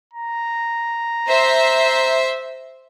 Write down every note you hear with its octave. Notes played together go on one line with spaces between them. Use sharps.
A#5
C5 E5